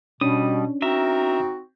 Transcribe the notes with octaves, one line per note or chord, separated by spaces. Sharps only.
B2 G3 C#4 D4 D#6
C4 D#4 F#4 A#4 E5